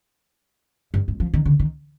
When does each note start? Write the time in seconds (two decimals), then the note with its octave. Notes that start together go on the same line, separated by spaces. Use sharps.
0.94 G2
1.08 G2
1.20 F3
1.34 D#3
1.45 D3
1.60 D#3